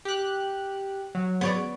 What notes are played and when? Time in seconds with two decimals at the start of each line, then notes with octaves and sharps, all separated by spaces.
0.05 G4 F#6
1.15 F#3
1.41 B3 C#5 D5